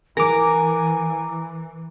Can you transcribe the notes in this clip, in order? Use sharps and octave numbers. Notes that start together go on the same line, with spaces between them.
E3 A#4 G#5 A#5 D6